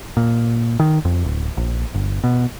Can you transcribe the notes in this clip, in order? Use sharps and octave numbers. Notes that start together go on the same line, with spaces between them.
A#2
D#3
F2
D1
A#1
G1
B2